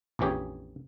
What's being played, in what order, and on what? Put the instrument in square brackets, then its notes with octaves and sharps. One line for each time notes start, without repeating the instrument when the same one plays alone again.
[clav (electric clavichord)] A#1 F2 E3 C#4 G4 G#4